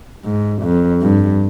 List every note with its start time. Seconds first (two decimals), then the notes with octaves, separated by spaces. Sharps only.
0.25 G#2
0.63 F2
1.02 G2